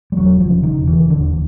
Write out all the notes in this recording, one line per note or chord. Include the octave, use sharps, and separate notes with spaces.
G3
E1 F#3
F3
C#3
D#3
E1
E3
D#2 D3